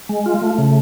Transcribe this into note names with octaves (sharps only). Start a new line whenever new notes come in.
G#3
F4
A3
C#3